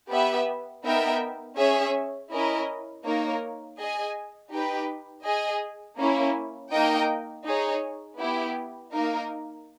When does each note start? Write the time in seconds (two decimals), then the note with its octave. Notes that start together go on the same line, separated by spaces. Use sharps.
0.10 B3 G4 B4 E5
0.84 B3 D#4 A#4 E5 G5
1.57 C#4 G#4 C#5 E5
2.31 C#4 E4 A#4 D#5
3.04 A#3 D#4 A#4 C#5
3.78 G#4 D#5 G#5
4.51 D#4 G4 B4 G5
5.24 G#4 D#5 G#5
5.98 A#3 C#4 E4
6.71 A#3 D#4 A#4 D#5 G5
7.45 D#4 G#4 C#5
8.18 B3 E4 G4
8.92 A#3 D#4 A#4